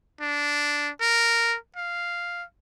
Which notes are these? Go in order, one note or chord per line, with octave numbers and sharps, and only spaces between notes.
D4
A#4
F5